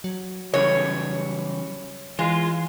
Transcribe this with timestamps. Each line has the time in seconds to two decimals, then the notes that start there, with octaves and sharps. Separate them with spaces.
0.04 F#3
0.54 C#3 E3 G3 C#5
2.19 E3 G#3 F4